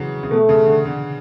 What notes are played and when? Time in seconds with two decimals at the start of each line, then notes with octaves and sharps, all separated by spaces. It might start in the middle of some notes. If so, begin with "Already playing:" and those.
Already playing: C#3 E3 F#3
0.23 C#3
0.31 B2 A3
0.49 C#3
0.66 D3
0.85 D3